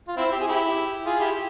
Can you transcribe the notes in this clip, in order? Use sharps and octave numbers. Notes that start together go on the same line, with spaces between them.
F4
C4 E4
G4
G#4
E4 G4
F4 G#4
E4 G4